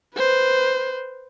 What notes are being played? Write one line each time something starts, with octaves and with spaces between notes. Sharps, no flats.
B4 C5